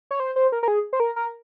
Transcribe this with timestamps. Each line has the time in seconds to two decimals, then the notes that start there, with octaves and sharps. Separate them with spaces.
0.11 C#5
0.20 C5
0.36 C5
0.52 A#4
0.63 A#4
0.68 G#4
0.93 C5
1.00 A#4
1.16 A#4